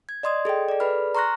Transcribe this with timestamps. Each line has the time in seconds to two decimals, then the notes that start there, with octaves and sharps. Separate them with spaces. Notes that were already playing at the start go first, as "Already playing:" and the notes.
0.09 G#6
0.23 D5 D#5 C6 D#6 G#6
0.45 G#4 A4 D#5 G5
0.69 A4 D5
0.80 G#4 B4 D5 B5 F6
1.15 A#5 C6 C#6 F6 F#6 A#6